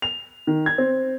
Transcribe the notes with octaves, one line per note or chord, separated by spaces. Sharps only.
F7
D#3
G#6
C4